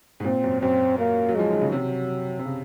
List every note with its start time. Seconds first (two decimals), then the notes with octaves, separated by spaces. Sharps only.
0.20 G#2
0.24 A#2 C4
0.44 F#2
0.61 F#2 C4
0.99 A#3
1.29 F#3
1.35 F3 G#3
1.50 D#3
1.61 C#3
1.72 C3 F#3
2.39 C3
2.45 C#3